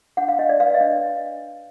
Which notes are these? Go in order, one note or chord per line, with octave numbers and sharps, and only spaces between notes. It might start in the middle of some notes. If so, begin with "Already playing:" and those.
D4 F#5
F5
D4 D#5
D5
B4 F5
D#5
D4